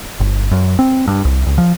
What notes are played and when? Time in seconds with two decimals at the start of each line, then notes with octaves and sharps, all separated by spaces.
0.20 G1
0.51 F#2
0.79 C4
1.08 G2
1.25 C2
1.46 C#2
1.58 F3